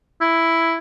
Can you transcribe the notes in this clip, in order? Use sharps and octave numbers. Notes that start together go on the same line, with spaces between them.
E4